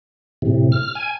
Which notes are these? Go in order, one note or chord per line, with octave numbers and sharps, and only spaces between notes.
A2 C3
F6
G#5